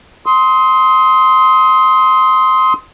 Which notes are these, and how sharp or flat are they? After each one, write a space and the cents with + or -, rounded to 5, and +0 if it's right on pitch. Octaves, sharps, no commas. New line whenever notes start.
C6 +0 D#6 +30